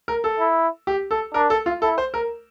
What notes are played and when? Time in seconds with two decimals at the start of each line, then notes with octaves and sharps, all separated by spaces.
0.08 A#4
0.24 A4
0.40 E4
0.87 G4
1.11 A4
1.34 D4 A#4
1.50 A4
1.66 F4
1.82 E4 A4
1.98 C5
2.14 A#4